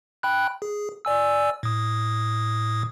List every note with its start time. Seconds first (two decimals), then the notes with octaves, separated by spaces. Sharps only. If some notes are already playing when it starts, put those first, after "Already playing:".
0.23 G5 B5 F#6
0.62 G#4
1.05 D5 G#5 E6
1.63 A2 D#6